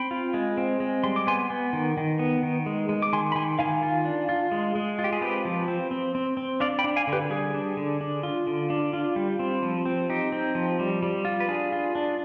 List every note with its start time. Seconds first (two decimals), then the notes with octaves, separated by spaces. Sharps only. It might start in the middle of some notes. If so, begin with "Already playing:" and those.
Already playing: C4 G5 B5
0.11 F4
0.34 G#3
0.57 C4
0.80 G#3
1.04 G3 C6
1.16 D6
1.27 B3 G#5 C6
1.50 B3
1.73 D#3
1.97 D#3
2.19 B3
2.43 D#3
2.66 G#3
2.89 G#3
3.02 D6
3.13 D#3 G#5 C6
3.32 B5
3.35 D#3 G#5 C6
3.59 D#3 F5 G#5
3.83 F4
4.05 D4
4.29 F4
4.52 G#3
4.75 G#3
4.99 F4
5.04 G4
5.13 G#4
5.21 C4 G4 B4
5.45 F3
5.68 C4
5.91 C4
6.15 C4
6.37 C4
6.60 D4 D5 F5
6.79 G5 B5
6.84 D4
6.96 F5 G#5
7.08 D3
7.13 G4 B4
7.30 G3 G#4
7.54 D4
7.77 D3
8.01 D4
8.23 F4
8.47 D3
8.70 D4
8.93 F4
9.16 G3
9.39 C4
9.63 F3
9.85 C4
10.10 D#4 G4
10.32 C4
10.55 F3
10.79 G3
11.03 G3
11.25 F4
11.40 B4
11.48 D4 G#4
11.72 F4
11.95 D4